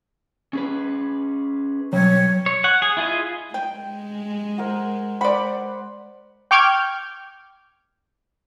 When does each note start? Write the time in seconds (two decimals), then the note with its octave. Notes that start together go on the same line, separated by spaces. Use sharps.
0.53 C#4 G#4 B4
1.93 B2 F#3 G3 C#5
2.46 C#5
2.64 C#5 F#5
2.82 G#4
2.97 E4 F4 G#4 D#5
3.54 G#3 G5
4.58 A#4 C5 F#5
5.21 C5 D5 F#5 B5
6.51 G5 C#6 D6 F6 G6 G#6